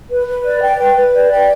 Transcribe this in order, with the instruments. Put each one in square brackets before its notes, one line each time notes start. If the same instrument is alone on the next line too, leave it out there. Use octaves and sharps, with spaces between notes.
[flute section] B4
B4
D5
G5
B4
B4
D5
G5